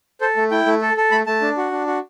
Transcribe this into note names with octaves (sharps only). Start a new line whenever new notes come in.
A4 C5
A3
E4 G5
A3
A4
A4
A3 B5
A3 A5
D4
F#4
D4
F#4